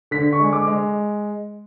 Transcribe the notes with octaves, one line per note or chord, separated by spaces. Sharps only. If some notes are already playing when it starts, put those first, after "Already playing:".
D3 B6
C#6
G#3
D6
G#3